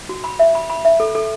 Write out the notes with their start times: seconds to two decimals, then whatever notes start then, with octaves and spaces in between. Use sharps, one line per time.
0.09 F#4
0.24 B5
0.39 E5
0.55 B5
0.70 B5
0.85 E5
1.00 A4
1.15 A4